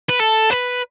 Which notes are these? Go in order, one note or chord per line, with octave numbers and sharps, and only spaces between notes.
B4
A4
B4